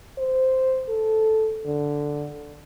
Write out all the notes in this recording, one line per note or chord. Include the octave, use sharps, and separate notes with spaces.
C5
A4
D3